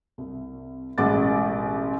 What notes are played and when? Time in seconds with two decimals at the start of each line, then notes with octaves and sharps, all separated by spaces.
0.18 C2
0.98 E1 A1 G#3 F#5 D6 A6